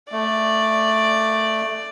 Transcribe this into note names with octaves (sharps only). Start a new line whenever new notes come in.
A3 D5